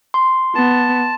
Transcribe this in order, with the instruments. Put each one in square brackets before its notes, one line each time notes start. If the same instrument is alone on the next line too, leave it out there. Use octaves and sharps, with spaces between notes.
[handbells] C6
[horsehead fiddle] B3 [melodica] A5